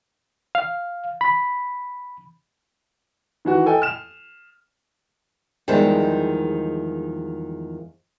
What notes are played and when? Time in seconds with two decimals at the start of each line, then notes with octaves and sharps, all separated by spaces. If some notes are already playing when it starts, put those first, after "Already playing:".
0.55 F5
1.21 B5
3.45 D#3 E3 F#4
3.66 A4 D#5 G5 G#5
3.82 F6 E7
5.68 E2 D#3 F3 G3 G#3 E4